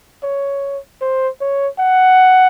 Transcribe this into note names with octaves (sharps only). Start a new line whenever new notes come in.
C#5
C5
C#5
F#5